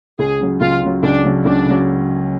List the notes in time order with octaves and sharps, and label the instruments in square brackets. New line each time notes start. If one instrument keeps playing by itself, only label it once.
[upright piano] C#2 [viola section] G#4
[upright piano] C#3 F#3
[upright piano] C#2 [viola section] F4
[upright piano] C#3 F#3
[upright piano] C#2 [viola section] D4
[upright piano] C#3 F#3
[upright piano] C#2 [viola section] D4
[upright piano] C#3 F#3